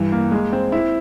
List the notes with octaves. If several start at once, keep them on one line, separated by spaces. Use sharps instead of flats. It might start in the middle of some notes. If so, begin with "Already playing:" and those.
Already playing: G2 E3
A#3
G#3
C4
E4